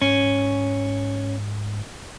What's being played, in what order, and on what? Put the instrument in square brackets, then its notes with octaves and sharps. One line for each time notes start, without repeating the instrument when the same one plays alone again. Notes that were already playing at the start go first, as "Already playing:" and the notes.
[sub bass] G#2 [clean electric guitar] C#4